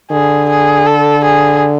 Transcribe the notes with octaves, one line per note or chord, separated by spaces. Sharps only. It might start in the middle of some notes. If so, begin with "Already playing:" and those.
D3 G#4
G#4
A4
G#4